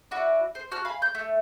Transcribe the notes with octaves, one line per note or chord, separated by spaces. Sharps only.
E4 F#4 D5
C5
F#4 A5 F6
F5 G#5 B5
G6
A3